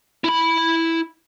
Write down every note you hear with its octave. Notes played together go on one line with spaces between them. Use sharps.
E4 B5